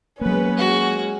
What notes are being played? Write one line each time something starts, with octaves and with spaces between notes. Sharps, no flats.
F#3 G#3 A#3 B3 C#4 B4
G#3 F#4